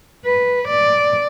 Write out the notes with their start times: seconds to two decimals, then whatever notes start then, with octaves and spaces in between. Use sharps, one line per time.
0.25 B4
0.68 D5